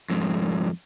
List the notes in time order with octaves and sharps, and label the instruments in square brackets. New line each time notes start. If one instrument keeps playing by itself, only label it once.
[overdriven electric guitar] F2 G#2